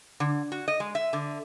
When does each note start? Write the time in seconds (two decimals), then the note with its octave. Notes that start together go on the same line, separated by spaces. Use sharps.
0.20 D3
0.52 F#4
0.68 D#5
0.80 G#3
0.95 E5
1.13 D3